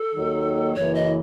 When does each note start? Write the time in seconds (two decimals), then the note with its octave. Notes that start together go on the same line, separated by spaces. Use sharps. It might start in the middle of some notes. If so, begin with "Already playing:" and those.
Already playing: A4
0.16 D#2 D#3 F#3
0.75 F#1 F#2 E3 C#5
0.95 D#5